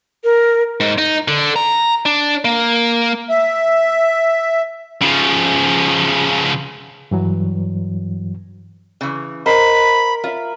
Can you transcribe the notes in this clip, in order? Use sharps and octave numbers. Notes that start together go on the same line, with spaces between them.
A#4
G#2
D#4
D3
A#5
D4
A#3
E5
C#3 F3
G2 E3 F#3
C#3 E3
A#4 C5 D#5 B5
F4 E5